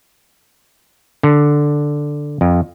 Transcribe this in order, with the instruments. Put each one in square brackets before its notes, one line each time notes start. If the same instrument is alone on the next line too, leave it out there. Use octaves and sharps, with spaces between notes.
[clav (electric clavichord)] D3
F2